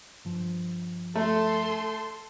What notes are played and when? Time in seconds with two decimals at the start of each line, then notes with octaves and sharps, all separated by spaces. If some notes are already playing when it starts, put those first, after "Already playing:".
0.25 G2 F3
1.15 A3 A4 C6